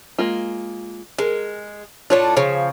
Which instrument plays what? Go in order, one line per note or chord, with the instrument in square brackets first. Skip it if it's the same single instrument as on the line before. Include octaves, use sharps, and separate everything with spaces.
[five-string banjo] G#3 A#3 F4
[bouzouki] G#3 [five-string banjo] A#4
[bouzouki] A2 A3 D4 [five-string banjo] F4 C#5
[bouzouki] C#3 F3 [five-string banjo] C#5